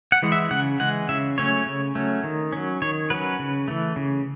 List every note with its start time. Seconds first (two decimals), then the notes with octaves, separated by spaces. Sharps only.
0.12 F#5
0.23 E3 G#3
0.32 E5
0.51 C#3 F#5
0.80 E3 G#3 F#5
1.09 C#3 E5
1.37 F#3 A3 C#4 C#5
1.66 C#3
1.95 F#3 A3 C#4
2.24 D#3
2.52 F#3 C#4
2.82 D#3 C#5
3.10 F#3 C#4 B4
3.39 C#3
3.68 E3 A3
3.96 C#3